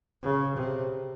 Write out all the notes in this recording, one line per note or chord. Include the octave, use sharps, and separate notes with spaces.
C#3
C3